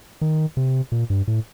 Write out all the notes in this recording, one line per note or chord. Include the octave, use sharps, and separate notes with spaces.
D#3
C3
A#2
G2
A2